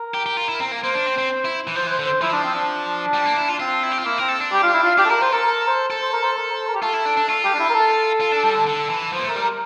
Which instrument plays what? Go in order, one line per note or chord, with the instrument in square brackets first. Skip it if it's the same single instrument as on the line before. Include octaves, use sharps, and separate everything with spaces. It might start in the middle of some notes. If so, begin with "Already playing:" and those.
Already playing: [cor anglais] A#4
[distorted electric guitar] G4
G4
F4
E4
C4
A#3
[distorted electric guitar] A#3 [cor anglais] C5
[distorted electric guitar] D4
C4
C4
E4
E3
[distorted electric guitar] F3 [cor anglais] C5
[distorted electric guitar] E3 [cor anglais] C5
[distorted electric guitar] D3
[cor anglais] C5
[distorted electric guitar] F3 [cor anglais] E4
[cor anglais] D4
C4
D4
[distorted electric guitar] G3
A#3
E4
F4
[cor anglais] D4
[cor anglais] C4 [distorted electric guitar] F4
[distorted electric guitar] E4
G4
F4
[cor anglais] A#3 [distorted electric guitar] E4
[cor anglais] C4 [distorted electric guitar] A#4
[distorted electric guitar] A4
D4
[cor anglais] G4
F4
E4
F4
[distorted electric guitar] D4 [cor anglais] G4
[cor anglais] A4
[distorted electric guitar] E4 [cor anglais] A#4
[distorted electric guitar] F4 [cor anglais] C5
[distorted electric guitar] A4 [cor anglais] A#4
[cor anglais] A#4
C5
[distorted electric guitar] A4
[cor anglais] C5
A#4
C5
A#4
C5
A#4
G4
[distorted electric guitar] F4 [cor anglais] A4
[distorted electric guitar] E4
D4
D4
[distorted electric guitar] F4 [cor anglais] A4
[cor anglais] G4
D4
E4
A#4
A4
[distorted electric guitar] F4
D4
G3
D3
D3
E3
[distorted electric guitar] F3 [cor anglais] C5
[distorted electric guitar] A#3
[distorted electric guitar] A3 [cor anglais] A#4
[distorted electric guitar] G3
[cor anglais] A#4